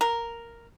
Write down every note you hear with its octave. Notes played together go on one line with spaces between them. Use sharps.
A#4